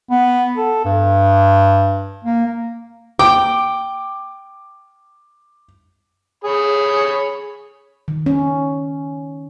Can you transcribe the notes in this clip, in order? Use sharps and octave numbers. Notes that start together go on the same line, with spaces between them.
B3
A4
G2
A#3
G5 D6
G#4 C#5 B5
D#3
C#4